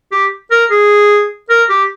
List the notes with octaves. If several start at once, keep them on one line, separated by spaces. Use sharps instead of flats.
G4
A#4
G#4
A#4
G4